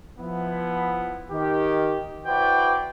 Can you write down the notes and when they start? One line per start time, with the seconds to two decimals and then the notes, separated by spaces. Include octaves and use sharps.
0.19 F3 B3 E4
1.31 D#3 G4
2.26 E4 F#4 B4 C5 D5 G5